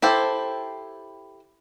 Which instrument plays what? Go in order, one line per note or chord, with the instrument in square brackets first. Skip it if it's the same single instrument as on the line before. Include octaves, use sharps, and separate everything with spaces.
[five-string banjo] E4 G4 A4 C5